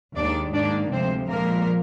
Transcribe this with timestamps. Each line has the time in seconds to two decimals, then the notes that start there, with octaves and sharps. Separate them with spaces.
0.16 D#2 D#3 G#3 D4 D5
0.54 G#2 D#3 A#3 D4 D5
0.92 D2 C3 F3 G#3 C4 C5
1.30 A#2 F3 G#3 A#3 A#4